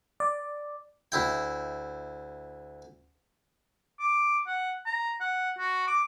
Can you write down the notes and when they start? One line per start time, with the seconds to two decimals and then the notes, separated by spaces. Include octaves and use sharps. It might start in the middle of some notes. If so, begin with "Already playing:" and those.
0.20 D5
1.12 D2 E4 G5
4.00 D6
4.47 F#5
4.86 A#5
5.21 F#5
5.58 F#4
5.88 D6